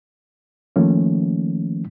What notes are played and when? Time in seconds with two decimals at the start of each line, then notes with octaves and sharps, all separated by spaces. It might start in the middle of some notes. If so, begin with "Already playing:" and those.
0.76 D#3 F3 A3 A#3 C#4